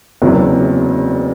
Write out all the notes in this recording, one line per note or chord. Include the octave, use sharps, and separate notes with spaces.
F#1 E2 C3 F#3